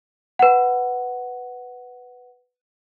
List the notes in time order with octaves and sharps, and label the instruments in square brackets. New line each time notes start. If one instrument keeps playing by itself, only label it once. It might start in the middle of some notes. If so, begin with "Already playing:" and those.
[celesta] B4 F#5